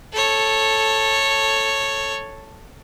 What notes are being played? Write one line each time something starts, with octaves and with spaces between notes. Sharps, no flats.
A4 C#5